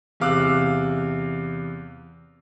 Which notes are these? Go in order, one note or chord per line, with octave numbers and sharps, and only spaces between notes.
E2 C3 F5 D6 E6 F#6